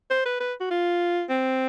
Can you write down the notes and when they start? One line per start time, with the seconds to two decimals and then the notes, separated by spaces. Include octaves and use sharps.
0.11 C5
0.26 B4
0.40 B4
0.60 F#4
0.71 F4
1.30 C4